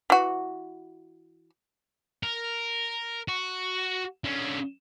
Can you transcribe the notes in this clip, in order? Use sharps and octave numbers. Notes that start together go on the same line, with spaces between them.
E3 F#4
A#4
F#4
D3 C#4